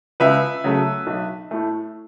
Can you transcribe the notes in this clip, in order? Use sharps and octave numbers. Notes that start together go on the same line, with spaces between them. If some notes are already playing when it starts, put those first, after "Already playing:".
C#2 B4 E5
C#3 F#3 A3
B1
A2 A3